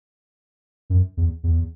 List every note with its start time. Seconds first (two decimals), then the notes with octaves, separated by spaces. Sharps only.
0.90 F#2
1.17 E2
1.43 E2